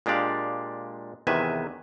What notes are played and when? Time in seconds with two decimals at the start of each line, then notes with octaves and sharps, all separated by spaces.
0.06 A#2 G#3 D4 G4 D5 F5
1.27 E2 C3 D#3 B4 E5 G#5